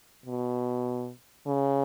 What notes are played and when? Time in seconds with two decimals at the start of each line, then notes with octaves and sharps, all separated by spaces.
0.26 B2
1.47 C#3